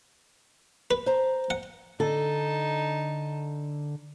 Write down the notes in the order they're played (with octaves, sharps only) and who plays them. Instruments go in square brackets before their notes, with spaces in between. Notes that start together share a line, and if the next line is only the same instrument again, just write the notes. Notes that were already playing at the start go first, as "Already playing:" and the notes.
[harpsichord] B4
[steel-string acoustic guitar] C5 A#5
[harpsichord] F#5
[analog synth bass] D3 [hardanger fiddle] D#4 A5 [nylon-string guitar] A4